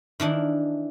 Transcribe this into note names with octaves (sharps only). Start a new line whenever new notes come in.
D#3 E3 D4